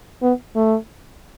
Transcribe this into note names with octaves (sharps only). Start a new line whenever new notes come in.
B3
A3